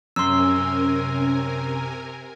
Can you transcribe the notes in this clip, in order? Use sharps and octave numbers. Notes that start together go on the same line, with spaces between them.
F#2 C3 C#4 A#4 G#5 C6 E6